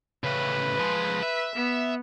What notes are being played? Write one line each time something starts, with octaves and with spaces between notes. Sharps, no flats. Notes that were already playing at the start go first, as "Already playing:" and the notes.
A2 C#3 B4
F3 G#3
E5
B3